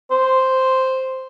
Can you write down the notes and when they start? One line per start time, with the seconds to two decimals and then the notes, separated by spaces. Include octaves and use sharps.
0.11 C5